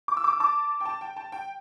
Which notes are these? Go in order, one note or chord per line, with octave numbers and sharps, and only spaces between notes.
D6
E6
D6
E6
A5 D6
G5
A5
G5
A5
G5